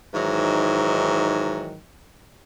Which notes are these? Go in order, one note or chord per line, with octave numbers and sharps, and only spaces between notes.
G#2 D#3 E3 F#3